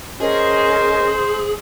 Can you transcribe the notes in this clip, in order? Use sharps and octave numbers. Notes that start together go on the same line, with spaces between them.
C#4 G#4 A#4 C5 D#5